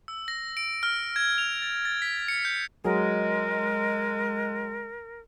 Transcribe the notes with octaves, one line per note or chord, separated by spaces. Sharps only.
E6
A#6
D7
F6
G#6
F7
A6
A6
B6
C#7
G6
F#3 G#3 G#4 A#4